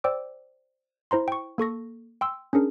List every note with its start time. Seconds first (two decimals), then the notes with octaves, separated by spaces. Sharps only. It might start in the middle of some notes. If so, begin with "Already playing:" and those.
0.04 C5 D5 G5 D6 E6
1.11 E4 C5 A#5 C6
1.28 G5 C#6
1.58 A#3 A4 C#6 A#6
2.21 G5 C6 E6
2.53 C#4 D4 G#4 A#4